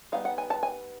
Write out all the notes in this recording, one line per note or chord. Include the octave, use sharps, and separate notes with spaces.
G3 B3 D#4 F5
F#5
G#5
A5
G#5